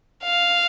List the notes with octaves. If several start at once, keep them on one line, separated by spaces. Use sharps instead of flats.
F5